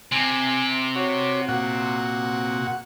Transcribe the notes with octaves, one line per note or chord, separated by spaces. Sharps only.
C3 G#5
F#4 C#5
A#2 F#4 F#5